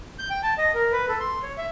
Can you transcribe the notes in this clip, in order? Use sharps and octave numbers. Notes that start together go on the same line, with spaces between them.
G6
G5
A5
D#5
A#4
B4
A4
C6
C#5
E5